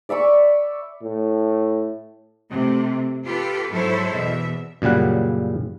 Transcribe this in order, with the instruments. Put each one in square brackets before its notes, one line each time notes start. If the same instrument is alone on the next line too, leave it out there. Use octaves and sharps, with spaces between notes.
[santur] D5 E5 B5 C#6
[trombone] A2
[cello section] C3 A3
F4 G4 A4 B4
G#2 F#3 E4 A4 C5 C#5
E2 B2 E5
[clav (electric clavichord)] F#2 A#2 C#3 G3 F#5